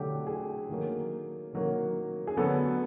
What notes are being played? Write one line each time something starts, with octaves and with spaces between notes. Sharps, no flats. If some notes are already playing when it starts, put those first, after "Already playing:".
Already playing: D3 F#3 A3 G4
G#4
D#3 F#3 A#3
D#3 F#3 A#3
G#4
D3 F#3 B3 A4